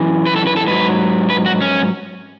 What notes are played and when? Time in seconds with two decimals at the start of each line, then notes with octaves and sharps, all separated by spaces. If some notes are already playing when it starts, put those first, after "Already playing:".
Already playing: F#2 E3
0.26 B4
0.36 A4
0.47 B4
0.57 A4
0.67 G#2 F#3 B4
1.30 B4
1.46 F#4
1.62 C#4